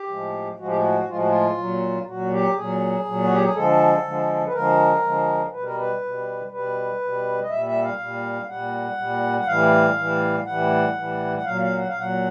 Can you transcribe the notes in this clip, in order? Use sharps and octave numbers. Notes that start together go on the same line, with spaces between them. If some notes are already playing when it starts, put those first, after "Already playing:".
Already playing: G4
A2 F3 G#3
A2 F3 G#3 F#4
G4
F#4
A2 F3 G#3 F4
F#4
F4
A#2 F#3
A#2 F#3 F#4
G4
A#2 F#3 G#4
A#2 F#3
F#4
G4
G#4
D3 F3 G#3 A4
D3 F3 G#3
B4
D3 F3 G#3 A#4
D3 F3 G#3
B2 G3 B4
A#4
B4
B2 G3
B2 G3 B4
B2 G3
D#5
A#2 G3 E5
E5
F5
A#2 G3
A#2 G3 F#5
A#2 G3
F#5
A2 E3 G3 F5
A2 E3 G3
A2 E3 G3 F#5
A2 E3 G3
F#5
A#2 F#3 F5
F5
F#5
F5
A#2 F#3 F#5